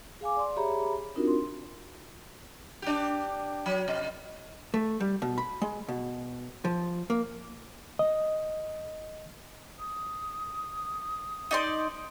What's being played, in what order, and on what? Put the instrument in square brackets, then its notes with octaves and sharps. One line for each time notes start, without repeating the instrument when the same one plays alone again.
[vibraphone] G#4 F5 G#5 D6
D5 C6
G4 G#4 C#5 E5 A#5 B5
C4 D4 D#4 F4 F#4 A#4
C6
[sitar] D4 G4
F#3
C3
[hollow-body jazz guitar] A3
G3
B2
B5
G#3
B2
F3
A#3
[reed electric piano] D#5
[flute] D#6
[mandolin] D#4 D5 C6